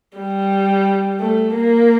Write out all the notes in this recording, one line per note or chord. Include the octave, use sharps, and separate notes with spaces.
G3
A3
A#3